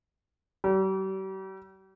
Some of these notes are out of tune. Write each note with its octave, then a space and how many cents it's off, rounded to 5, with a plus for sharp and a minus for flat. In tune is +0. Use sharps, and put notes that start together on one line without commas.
G3 -45